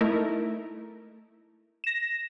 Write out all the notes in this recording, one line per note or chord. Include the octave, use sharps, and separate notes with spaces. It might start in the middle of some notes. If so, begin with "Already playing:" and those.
A3 D#4 E4 A#4
A#6 E7